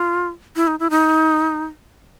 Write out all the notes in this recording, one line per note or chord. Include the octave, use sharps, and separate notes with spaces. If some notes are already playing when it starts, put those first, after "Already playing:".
Already playing: F4
E4
D#4
E4
D#4